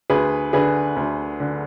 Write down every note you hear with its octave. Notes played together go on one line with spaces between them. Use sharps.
D2 G#4 B4
D3 G#4 B4
D2
D3